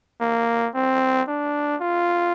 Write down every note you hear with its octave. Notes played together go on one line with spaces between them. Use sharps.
A#3
C4
D4
F4